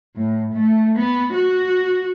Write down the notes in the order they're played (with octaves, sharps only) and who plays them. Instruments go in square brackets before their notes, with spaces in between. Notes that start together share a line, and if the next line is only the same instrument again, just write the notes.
[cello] A2
A3
B3
F#4